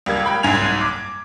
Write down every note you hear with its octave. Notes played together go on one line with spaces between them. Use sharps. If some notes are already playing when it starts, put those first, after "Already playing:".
C#2 G3 A#3 G#6
G5 B5
F#1 C2 G#2 G#5 G#6 F7
D6